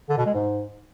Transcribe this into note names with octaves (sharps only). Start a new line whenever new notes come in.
D3
B2
G#3
G#2